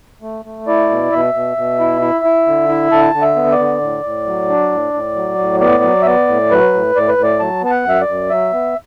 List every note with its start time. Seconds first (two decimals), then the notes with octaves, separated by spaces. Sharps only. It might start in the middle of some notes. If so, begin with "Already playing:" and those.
0.22 A3
0.45 A3
0.67 E4 D5
0.90 B2
1.12 B2 E5
1.34 B2
1.57 B2
1.80 E4
2.02 E4
2.25 E4
2.47 D3
2.69 E4
2.92 D3 A5
3.14 D3
3.22 E5
3.36 B3
3.52 D5
3.59 D3
3.81 A2
4.03 A2
4.26 F#3
4.49 D4
4.71 A2
4.94 A2
5.16 F#3
5.38 A2
5.60 B3 D5
5.83 F#3
6.02 E5
6.06 B3 D5
6.28 A2
6.51 F#3 B4
6.73 A2
6.95 A2 D5
7.09 B4
7.18 A2
7.23 D5
7.40 F#3 A5
7.63 B3 A5
7.70 F#5
7.85 F#2 E5
8.01 D5
8.08 F#2
8.30 F#3 E5
8.53 B3